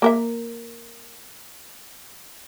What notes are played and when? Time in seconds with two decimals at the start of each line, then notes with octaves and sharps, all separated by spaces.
0.02 A#3 A#4 E5